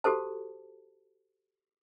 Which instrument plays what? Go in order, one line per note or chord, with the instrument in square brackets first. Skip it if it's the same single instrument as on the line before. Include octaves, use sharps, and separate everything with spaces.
[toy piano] F#4 G4 A4 C5 A5